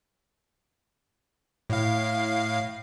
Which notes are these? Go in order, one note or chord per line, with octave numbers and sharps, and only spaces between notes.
A2 F5